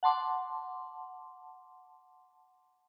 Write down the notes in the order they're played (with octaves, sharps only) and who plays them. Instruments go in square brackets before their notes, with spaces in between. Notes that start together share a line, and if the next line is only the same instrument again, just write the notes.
[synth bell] F#5 A5 C6 D6